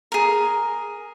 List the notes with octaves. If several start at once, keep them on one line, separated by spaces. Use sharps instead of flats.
G#4 A#4